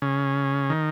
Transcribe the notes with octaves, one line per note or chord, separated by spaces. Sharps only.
C#3
D#3